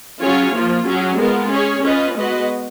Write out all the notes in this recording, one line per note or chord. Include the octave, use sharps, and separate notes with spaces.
F#3 C#4 F4 G#4 C#5
F3 A#3 F4
F#3 C#4 G#4
G#3 B3 F4 A#4
C#4 G#4 C#5
C#4 F4 B4 D#5
G#3 B3 F#4 B4 D#5